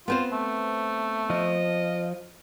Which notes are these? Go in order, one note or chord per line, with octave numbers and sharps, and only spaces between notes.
B3 C4 F4 C5
A3
F3 D#5